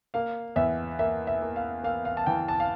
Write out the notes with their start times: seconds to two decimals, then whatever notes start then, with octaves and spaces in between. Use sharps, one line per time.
0.14 A#3 F5
0.56 E2 E5
0.99 A#3 E5
1.27 E5
1.42 A#3
1.56 F5
1.83 A#3 F5
2.05 F5
2.17 A5
2.27 E3 G5
2.48 A5
2.60 F5